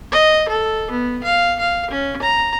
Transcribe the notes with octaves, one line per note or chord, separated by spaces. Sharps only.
D#5
A4
B3
F5
F5
C#4
A#5